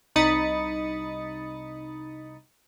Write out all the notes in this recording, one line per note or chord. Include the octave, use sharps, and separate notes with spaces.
C2 D#4 B5 D#6 A6 C#7